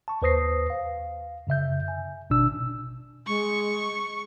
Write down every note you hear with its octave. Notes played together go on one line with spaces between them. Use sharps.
A5 C#6
D#2 B4 C5 D#6 A#6 C7
F5
F#2 C#3 E5 G6
G#5
G#1 B2 D4 E6
G#3 C#6